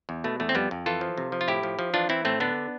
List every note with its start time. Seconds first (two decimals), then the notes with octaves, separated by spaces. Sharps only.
0.09 E2
0.24 B2 A3
0.40 E2 A3
0.49 C4
0.55 F2 G3 B3
0.71 F2
0.86 E3 F4 A4
1.01 F3
1.18 C3
1.32 F3
1.41 F4
1.48 A2 E4 G4
1.63 F3
1.79 F3
1.94 E3 D4 F4
2.09 E3 C4 E4
2.25 A2 A3 C4
2.40 D3 B3 D4